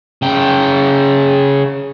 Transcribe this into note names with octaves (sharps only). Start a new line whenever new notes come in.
C#3 G5